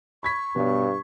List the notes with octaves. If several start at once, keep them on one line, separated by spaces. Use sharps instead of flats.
B5 C#6 G#6 B6
G2 B2 C#5